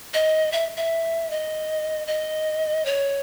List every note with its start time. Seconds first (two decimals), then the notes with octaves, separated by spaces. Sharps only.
0.14 D#5
0.52 E5
0.77 E5
1.31 D#5
2.07 D#5
2.85 C#5